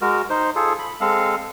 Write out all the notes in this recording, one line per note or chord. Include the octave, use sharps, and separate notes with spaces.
G#3 F#4 A#4
D#4 C5
F4 G#4 A4
B5
G#3 C4 A4 F5